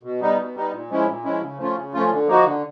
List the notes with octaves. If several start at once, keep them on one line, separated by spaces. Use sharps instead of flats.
B2
G3 B3 D#4
B2
G3 B3 D#4
A#2
F3 G#3 C#4 E4
A#2
F3 G#3 C#4 E4
C#3
F3 A3 C#4 F4
C#3
F3 A3 C#4 F4
D3
F3 A#3 D#4 F#4
D3